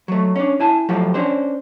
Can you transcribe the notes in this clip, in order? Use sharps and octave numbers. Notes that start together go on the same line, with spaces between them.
F#3 A3
C#4 D4
E4 G#5 A5
F3 F#3 A3 F4 G4
C#4 D4 C5